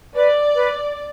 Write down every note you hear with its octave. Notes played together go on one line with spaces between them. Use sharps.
B4 D5
B4